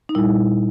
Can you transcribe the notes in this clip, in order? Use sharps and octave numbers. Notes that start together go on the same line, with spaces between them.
D#4
A#2 G3 E4